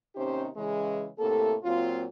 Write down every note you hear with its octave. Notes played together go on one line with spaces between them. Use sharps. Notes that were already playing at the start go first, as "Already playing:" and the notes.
D#2 C3 C#4 D#4 G4 C5
C#3 E3 G#3
A2 C3 A#3 A4
A#2 F#3 C4 F4